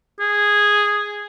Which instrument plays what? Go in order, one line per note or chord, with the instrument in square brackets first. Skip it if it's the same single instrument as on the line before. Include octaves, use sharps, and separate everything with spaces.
[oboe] G#4